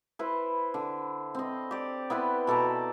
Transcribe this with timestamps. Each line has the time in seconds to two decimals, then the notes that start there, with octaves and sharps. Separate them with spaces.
0.19 E4 B4 C5
0.74 D3
1.35 C4 D#5
1.71 G4 D5
2.10 B3 E4 B4 C5
2.47 B2 A4 D5 A#5